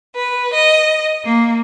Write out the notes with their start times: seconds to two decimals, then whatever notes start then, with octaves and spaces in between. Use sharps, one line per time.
0.15 B4
0.53 D#5
1.24 A#3